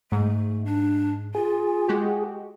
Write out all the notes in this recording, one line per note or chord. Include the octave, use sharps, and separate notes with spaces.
G#2 A3
D4
F4 G#4
G#3 F#4 G4